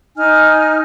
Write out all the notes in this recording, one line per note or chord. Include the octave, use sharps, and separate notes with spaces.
D#4 G#5 F6